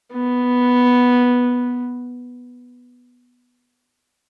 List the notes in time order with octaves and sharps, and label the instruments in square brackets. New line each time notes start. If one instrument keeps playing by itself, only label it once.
[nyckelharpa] B3